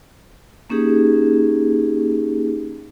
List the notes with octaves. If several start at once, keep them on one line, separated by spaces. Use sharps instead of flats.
A#3 C#4 D#4 G4 G#4